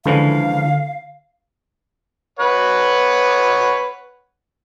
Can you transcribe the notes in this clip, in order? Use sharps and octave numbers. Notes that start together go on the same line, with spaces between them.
C#2 D3 E3 F3 F5
B4 C#5 F#5